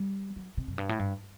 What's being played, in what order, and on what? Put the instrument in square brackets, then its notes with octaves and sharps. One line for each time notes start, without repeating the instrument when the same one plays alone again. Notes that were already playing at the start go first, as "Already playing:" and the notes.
Already playing: [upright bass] G3
F#3
C3
F#2
G2
A2
G2